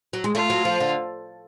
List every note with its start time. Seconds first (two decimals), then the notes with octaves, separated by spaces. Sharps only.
0.13 F#3
0.24 G#3
0.35 A3 F4
0.50 F#3
0.65 F3
0.80 D3